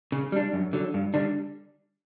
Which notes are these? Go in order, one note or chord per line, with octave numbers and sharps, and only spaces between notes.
C#3
G3 D4
F#2
D3 F#3
G2
D3 G3 D4